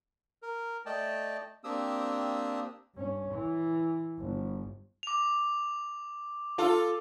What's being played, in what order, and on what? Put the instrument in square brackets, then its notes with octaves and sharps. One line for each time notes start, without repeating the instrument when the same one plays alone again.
[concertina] A#4
A3 D5 D#5 G5 A5
A#3 C4 D4 G4 D#6 E6
[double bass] G2 C#4
E3
G1
[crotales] D6 F7
[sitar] F4 A4